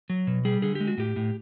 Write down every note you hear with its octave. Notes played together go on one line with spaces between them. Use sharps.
F#3
B2
G3 G#4
D3 G#4
G4
G#3
F#4
A2 G4
A2